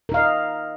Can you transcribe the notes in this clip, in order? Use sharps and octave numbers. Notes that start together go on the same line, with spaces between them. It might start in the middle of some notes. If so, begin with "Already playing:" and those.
D#4 A#4 D#5 F5